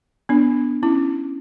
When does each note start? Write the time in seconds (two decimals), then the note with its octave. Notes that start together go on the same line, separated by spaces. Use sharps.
0.29 B3 D4
0.83 C#4 E4